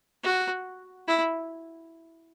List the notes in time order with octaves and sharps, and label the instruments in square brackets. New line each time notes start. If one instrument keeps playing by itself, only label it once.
[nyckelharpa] F#4
E4